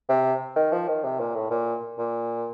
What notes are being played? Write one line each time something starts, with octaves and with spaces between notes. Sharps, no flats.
C3
D#3
F3
D#3
C3
A#2
A2
A#2
A#2